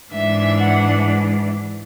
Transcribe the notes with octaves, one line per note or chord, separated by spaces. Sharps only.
G#2 E3 G#3 D4 E5
F#5